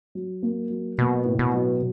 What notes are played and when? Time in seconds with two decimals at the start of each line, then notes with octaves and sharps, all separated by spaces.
0.15 F#3
0.43 A#3
0.70 F#3
0.98 B2 A#3
1.25 A2
1.39 B2
1.54 F#3